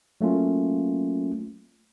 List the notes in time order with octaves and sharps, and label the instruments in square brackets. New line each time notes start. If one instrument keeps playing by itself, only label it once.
[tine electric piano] F#3 A3 A#3 C#4 F4